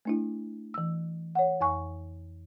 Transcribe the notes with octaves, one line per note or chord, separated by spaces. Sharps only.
A3 D4 E4
E3 E6
C#5 F#5
F2 G#5 C#6